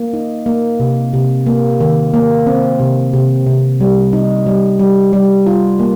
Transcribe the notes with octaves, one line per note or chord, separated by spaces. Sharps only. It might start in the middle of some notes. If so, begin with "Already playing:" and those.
Already playing: A#3
D#4
A#3
C3
C3
A#3
D#3
A#3
C4
C3
C3
C3
G3
D#4
G3
G3
G3
F4
A#3